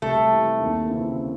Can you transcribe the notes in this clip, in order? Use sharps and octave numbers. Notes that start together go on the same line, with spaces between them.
C2 A3
C3 E3
D#2
C#3 E3 C4 E4